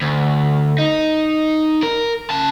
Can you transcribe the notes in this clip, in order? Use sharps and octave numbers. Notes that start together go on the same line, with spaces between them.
D2
D#4
A#4
C#3 A5